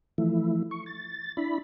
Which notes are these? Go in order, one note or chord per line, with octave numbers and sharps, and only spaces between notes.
E3 F3 A3 E4
C#6
A6
D4 E4 B5